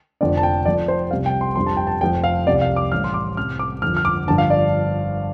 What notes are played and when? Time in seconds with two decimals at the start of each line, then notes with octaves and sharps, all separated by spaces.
0.21 F1 F2 D3 D5
0.37 A5
0.43 G5
0.65 F2 F3 D5
0.88 C5
1.11 C2 C3 G3 F5
1.26 G5
1.41 C6
1.56 G1 F2 D3 G3 C6
1.67 A5
1.77 G5
1.87 A5
2.01 F1 F2 F3 G5
2.24 F5
2.47 C2 C3 G3 D5
2.61 F5
2.76 D6
2.92 A1 A2 G3 F6
3.04 C6
3.14 D6
3.36 C2 C3 G3 F6
3.59 D6
3.82 G1 F2 F3 F6
3.97 F6
4.05 D6
4.28 G1 G2 F3 A5
4.38 F5
4.50 D5